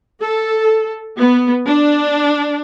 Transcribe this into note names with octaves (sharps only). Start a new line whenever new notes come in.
A4
B3
D4